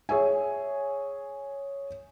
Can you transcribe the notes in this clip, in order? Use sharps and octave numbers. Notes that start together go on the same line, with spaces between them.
G#4 C#5 E5 G#5